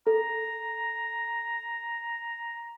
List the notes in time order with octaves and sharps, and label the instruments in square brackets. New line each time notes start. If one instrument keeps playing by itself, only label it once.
[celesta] A4 [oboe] A#5